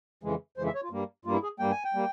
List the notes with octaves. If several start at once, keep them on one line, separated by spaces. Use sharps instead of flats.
F2 C#3 E3 G#3
F2 C#3 E3 G#3 C5
E5
C#5
F4
G2 G3 A#3
G2 G3 A#3 F4
E4
G#4
G2 G3 A#3 G5
G#5
G5
G3 A#3